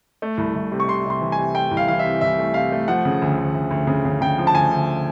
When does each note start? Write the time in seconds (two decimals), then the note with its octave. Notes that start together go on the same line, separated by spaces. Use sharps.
0.22 A3
0.38 C2
0.56 C2
0.72 C3
0.80 C#6
0.89 C3 C6
1.05 C3 C6
1.21 E3
1.32 G#5
1.38 C3
1.54 A3 G5
1.71 C2
1.77 F5
1.88 E3 F5
1.99 C3 E5
2.21 C2 E5
2.39 A3
2.54 C3 F5
2.72 A3
2.88 F3 F#5
3.05 C#3
3.22 D2
3.38 D2
3.54 D2
3.71 D2
3.87 C#3
4.05 C#3
4.21 C#3 G5
4.38 F3
4.47 A5
4.55 D2 G#5
4.71 D2